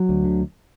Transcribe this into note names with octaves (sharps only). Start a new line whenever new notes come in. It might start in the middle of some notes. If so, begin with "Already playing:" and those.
Already playing: F#3
D2
D3